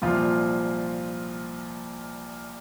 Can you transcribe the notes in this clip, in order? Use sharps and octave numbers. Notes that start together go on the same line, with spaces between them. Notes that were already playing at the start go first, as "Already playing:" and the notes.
C2 A#2 F3 F4